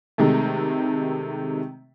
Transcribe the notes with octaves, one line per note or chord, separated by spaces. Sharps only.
C3 D#3 G#3 A3